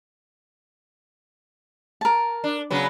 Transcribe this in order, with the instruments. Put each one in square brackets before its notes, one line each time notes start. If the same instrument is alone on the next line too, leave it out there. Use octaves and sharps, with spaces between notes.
[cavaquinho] A#4 A5
[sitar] D4
C#3 F#3 B3